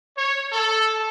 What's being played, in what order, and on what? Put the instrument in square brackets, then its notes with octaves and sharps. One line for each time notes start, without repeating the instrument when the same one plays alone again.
[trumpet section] C#5
A4